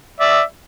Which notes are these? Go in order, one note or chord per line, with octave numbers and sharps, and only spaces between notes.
D5 E5